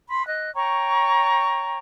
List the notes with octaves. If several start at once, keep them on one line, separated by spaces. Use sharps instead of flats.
B5 C6
D#5 F#6
C#5 G5 A#5 C#6